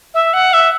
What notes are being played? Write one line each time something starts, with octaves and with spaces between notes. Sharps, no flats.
E5
F#5
E5